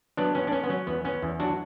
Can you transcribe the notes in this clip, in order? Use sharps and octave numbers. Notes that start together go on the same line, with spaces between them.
F#3 B3 D4
B3 C#4
D4
B3 C#4
B3
F#3 C#4
E2 B3
B3 C#4
E2
F#3 D4 F#4